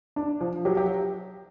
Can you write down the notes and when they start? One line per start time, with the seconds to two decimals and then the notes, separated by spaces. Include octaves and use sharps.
0.16 D4
0.41 F3
0.65 F#3 G4
0.77 G4